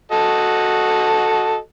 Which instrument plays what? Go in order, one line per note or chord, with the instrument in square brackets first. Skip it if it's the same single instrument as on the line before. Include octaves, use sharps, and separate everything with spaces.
[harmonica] F#4 A4 D#5